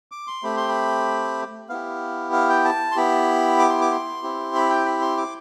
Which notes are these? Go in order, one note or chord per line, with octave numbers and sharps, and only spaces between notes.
D6
C6
A3 C4 G4 B5
C6
B5
B3 E4 G4 F5
F5
G5
A5
C6
B3 E4 G4 B5
D6
C6
D6
C6
C4 E4 G4
B5
G5
B5
C6
D6